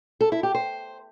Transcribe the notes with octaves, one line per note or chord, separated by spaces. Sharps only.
A4
E4
G4
C5